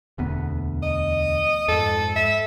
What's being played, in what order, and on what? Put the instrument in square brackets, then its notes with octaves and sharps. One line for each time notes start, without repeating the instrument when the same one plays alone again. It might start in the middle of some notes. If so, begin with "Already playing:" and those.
[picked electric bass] E1 D2 B3
[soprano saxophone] D#5
[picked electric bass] F2 G#2 [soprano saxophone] A4
[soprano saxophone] E5